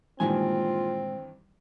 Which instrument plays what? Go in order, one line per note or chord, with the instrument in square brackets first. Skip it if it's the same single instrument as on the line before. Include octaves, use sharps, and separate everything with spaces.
[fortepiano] G2 D#3 E3 [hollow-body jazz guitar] A#2 G#3 G#5 [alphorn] C4 [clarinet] F4